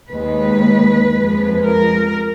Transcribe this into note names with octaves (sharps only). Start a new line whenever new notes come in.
D#2 D#3 G#3 B4
F2 F3 G#3
A#4